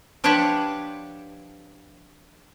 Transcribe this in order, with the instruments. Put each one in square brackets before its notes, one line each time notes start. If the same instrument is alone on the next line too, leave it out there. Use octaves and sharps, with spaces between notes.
[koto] F3 D4 G4 B4 C#5 F#5